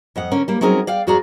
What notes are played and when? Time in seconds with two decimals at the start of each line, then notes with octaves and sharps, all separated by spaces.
0.16 F2 D#5 F#5
0.31 D3 C#4 A#4
0.48 G3 A#3
0.61 F#3 C4 C#4 D#4 G#4 A#4
0.87 D5 F5 G5
1.07 F2 F#4 G#4 D5 A#5